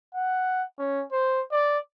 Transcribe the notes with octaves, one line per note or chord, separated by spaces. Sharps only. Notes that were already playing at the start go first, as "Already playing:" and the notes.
F#5
C#4
C5
D5